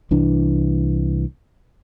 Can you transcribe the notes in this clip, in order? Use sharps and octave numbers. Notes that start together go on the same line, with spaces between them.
C2 E3 D4